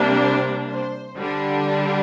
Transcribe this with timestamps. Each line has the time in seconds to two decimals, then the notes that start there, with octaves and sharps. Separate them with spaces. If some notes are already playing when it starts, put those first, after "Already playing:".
Already playing: C3 G3 A#3 D4
0.23 C5
0.70 C5
1.18 D3 G3 D4